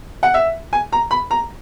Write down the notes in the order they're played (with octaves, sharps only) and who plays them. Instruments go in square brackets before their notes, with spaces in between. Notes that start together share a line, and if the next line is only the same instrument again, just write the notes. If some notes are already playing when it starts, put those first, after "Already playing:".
[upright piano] F#5
E5
G#5
A#5
B5
A#5